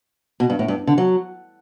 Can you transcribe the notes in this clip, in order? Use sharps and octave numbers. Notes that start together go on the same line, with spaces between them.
B2
G2
A2
G2
D3
F#3